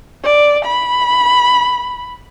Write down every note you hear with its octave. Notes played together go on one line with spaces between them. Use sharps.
D5
B5